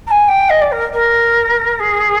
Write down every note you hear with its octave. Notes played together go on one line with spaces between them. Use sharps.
A#5
G#5
G5
D#5
D5
A#4
A#4
G#4